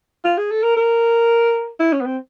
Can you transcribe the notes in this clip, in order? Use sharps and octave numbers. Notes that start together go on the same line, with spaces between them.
F4
G#4
A4
A#4
A#4
E4
C#4
B3
C4